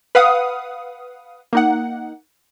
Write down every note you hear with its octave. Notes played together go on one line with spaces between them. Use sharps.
B4 F5 F#5 D#6
A#3 D#4 F#5